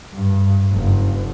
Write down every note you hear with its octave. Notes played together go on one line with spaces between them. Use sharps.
G2
F#1